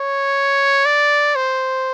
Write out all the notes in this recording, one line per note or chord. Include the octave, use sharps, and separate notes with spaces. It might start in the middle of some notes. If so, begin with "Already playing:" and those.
Already playing: C#5
D5
C5